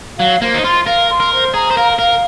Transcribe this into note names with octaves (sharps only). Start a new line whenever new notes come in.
F#3 F5
A#3 C5
D#4
F4 C6
A#4 F5
C6
A#4
C5
G#4 A#5
C5
A#4 F5
A#4 F5